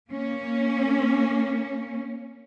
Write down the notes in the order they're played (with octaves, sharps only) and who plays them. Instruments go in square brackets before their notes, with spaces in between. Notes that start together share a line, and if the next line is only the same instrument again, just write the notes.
[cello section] A#3 C#4